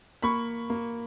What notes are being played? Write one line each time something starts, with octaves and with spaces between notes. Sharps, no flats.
A#3 B5 C#6
A#3